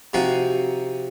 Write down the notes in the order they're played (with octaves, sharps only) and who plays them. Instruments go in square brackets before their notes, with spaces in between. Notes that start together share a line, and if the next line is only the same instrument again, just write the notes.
[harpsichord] C3 F3 C4 D#4 F#4